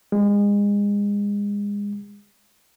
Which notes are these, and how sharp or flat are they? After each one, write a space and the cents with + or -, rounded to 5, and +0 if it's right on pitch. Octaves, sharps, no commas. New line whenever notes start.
G#3 -30